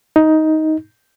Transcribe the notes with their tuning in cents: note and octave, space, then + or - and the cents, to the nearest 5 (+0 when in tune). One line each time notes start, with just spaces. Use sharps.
D#4 +10